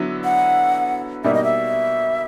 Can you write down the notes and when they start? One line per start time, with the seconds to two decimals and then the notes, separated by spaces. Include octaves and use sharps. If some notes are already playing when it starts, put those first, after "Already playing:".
Already playing: D3 F#3 B3 E4
0.24 F#5
1.24 B2 G3 A#3 D#4 E5
1.34 D#5
1.44 E5